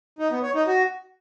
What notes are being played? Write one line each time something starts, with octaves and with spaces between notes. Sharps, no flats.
D#4
B3
C#5
D#4
F#4